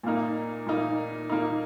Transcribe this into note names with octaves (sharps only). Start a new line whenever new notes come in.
A#2 A#3 D#4
A#2 A#3 D#4
A#2 A#3 D#4